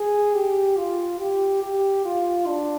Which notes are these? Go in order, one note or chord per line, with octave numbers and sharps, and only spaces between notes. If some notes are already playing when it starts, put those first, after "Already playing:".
Already playing: G#4
G4
F4
G4
G4
F4
D4